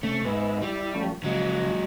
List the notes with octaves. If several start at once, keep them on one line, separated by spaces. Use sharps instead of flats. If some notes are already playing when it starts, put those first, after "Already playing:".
C3 A3 C#4
G#2 B3 B4 E5
G3 E4
F3 A3 C#4
C#3 F3 F#3 G#3